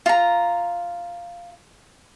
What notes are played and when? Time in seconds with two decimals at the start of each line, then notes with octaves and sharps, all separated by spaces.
0.06 F4 A#5